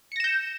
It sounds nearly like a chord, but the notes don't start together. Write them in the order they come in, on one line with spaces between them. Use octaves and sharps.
C#7 A#6 E7 G6